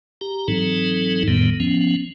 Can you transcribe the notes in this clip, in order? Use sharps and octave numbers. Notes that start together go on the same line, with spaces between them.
G4 A#5
G#2 E3 F#3 C4 D#4 A4
F2 A2 D#3 G3 B3
F3 B3 C#4